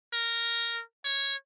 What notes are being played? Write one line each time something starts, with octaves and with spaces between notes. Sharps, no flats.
A#4
C#5